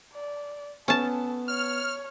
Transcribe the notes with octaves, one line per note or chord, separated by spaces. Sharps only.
D5
B3 C#4 A4 A5
C#5 F6